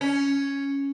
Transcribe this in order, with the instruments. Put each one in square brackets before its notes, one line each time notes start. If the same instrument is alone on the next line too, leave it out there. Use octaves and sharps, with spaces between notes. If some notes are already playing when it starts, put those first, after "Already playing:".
[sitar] C#4